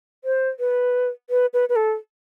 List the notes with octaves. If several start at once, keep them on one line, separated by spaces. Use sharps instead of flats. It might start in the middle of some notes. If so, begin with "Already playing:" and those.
C5
B4
B4
B4
B4
A4